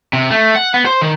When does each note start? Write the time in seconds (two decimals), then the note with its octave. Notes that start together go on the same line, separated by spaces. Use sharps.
0.13 C3
0.30 A3
0.56 F#5
0.74 B3
0.86 C5
1.01 D#3